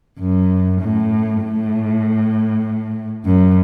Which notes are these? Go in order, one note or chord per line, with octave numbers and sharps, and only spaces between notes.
F#2
A2
A2
F#2